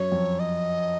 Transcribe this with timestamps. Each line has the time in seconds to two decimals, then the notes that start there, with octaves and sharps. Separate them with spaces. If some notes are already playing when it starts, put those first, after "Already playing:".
Already playing: F#2 C#5
0.12 F2
0.39 D#5